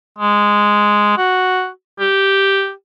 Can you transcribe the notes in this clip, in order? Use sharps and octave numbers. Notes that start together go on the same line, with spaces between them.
G#3
F#4
G4